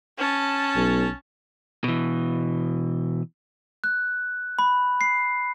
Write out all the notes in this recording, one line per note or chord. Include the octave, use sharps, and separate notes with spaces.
C#4 A5
B1
B2 E3
F#6
B5
C7